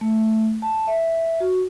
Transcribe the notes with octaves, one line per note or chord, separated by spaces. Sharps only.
A3
A5
E5
F#4